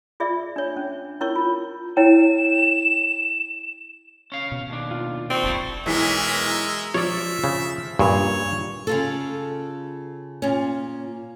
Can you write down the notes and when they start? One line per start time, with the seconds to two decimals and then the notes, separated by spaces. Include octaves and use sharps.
0.20 F4 G#4 D5 E5
0.56 D4 C#5
0.77 C#4
1.21 C#4 E4 A#4 C#5 C#6
1.36 F4
1.97 E4 C#5 G5 E7
4.32 C#4 F5
4.52 B2
4.70 D#2 D4
4.91 F4
5.30 C4 D5 C#6
5.44 F1 A#1 F3 G3 E4
5.86 B1 E3 G#3 A#4 E5 B6
6.94 F3 C#5 D5 E5
7.44 C#3
7.99 G2 A#2 C#3 C#5
8.87 C#3 F4 A4
10.42 A#2 C#4